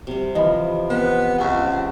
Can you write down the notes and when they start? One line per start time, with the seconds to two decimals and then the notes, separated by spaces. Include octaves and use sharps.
0.07 C3 G3
0.35 E3 F3 D#5 B5
0.90 B3 C4
1.38 C#2 C4 E5 F#5 C#6